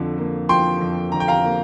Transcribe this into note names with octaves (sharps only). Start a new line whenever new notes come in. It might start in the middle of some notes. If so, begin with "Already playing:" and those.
Already playing: F2 D3 F3
A#3
F3 G5 C6
F2
D3 A#5
G5
F5 A#5
A#3